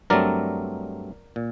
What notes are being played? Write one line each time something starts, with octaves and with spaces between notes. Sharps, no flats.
G2 F#3 A3 C4 A#4 D5
A#2